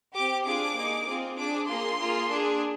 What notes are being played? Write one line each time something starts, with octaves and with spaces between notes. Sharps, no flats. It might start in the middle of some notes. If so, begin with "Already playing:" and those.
C4 G4 D6
D4 F4 G#4 D6
A#3 D#4 G#4
C4 F4 G#4
D4 G#4 D6
A#3 F4 G#4 C6
A#3 F4 G#4
D4 G#4